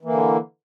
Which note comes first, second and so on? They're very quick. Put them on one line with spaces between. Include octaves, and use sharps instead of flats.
E3 A#3 D3